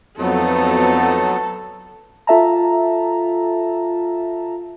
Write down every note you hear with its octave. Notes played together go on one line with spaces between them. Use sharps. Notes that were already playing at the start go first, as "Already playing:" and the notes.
F2 F#3 A3 B3 D#4 A4
F4 A4 E5 A5 A#5